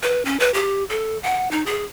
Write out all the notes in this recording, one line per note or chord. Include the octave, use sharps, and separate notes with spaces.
B4
C#4
B4
G4
A4
F#5
D#4
G#4